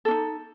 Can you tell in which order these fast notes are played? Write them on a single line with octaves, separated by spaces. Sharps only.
A4 C#4 D#4